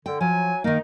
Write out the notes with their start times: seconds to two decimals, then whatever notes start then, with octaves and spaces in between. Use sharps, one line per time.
0.06 D3 G5
0.21 F3 F#3 G#5
0.64 D#3 A#3 D#4